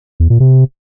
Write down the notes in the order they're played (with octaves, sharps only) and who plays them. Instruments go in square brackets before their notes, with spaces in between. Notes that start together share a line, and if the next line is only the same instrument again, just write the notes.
[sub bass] E2
A#2
C3